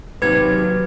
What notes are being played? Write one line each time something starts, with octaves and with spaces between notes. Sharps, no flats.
D#2 C3 F#3 B4 G#6